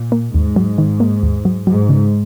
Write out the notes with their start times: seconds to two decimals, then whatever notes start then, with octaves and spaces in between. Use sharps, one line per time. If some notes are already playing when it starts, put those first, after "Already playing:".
Already playing: A#2
0.12 A#3
0.34 D#2 G#2
0.56 F#3
0.78 D#3
1.00 A#3
1.23 D#2
1.45 F#3
1.67 G#2 F#3
1.89 C#3